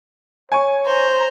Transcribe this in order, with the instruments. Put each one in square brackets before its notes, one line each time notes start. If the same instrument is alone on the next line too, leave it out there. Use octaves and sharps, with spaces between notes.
[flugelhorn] C#5 [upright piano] G#5 C#6
[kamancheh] C5 A#5